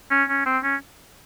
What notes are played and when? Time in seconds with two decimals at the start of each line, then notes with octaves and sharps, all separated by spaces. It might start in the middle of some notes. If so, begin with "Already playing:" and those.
0.11 C#4
0.29 C#4
0.46 C4
0.63 C#4